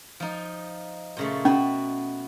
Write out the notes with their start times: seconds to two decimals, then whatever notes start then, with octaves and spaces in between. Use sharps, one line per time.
0.20 F3 D#4
1.17 A#2 C#3 A3
1.45 B2 C#4 F#4